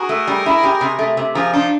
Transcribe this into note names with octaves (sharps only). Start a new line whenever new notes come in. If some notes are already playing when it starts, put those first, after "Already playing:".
Already playing: F#4 G#4 A#4
A3
G3
E4
G4
C3
A3
C3
F3 G#4 A#4
D4 D#4 F4